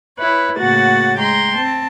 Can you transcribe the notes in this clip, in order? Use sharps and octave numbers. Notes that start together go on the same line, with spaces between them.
E4 B4 C#5
A2 C#3 A#3 F#4 F#5 A6
G#3 G5 A#5 C6
C4 A5